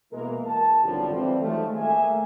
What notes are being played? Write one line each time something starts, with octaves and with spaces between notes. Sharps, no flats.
B2 E3 G#3 A#3 A#4
A5
G#1 C#2 F#2 D3 F3 G3
E3 F3 G3 C4
D#3 F3 F#3 G#3 A3
A3 A#3 G#4 E5 G#5